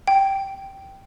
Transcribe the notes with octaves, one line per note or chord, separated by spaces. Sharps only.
G5